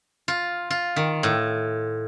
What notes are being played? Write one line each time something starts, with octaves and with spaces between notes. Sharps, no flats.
F4
F4
D#3
A2